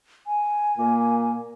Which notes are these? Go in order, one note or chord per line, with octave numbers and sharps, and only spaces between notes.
G#5
A#2 A#3